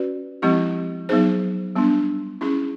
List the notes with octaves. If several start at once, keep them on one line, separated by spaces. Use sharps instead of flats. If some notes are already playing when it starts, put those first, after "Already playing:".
Already playing: C#4 F#4 B4 D5
F3 G#3 C4 E4 G4
F#3 B3 D#4 G#4 C5
G3 B3 D4
C#4 E4 G#4